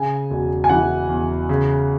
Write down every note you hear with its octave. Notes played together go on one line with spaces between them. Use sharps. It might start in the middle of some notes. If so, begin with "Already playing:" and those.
Already playing: C#3 G#5
E1
G#5
E3 F#5
E2
C#3